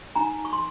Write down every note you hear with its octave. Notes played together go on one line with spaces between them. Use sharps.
D#4 G#5 A#5
C#6
C6